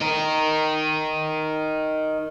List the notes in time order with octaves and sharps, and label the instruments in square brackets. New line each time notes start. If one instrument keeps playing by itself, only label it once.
[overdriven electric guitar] D#4 A#4